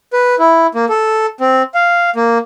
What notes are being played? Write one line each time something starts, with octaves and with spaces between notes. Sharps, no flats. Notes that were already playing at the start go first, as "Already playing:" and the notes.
B4
E4
A#3
A4
C4
F5
A#3